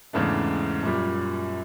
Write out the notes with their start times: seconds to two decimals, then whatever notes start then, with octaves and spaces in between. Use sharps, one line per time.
0.13 E2 G#2 C#3 A3 D4
0.83 F#2 A#2 G3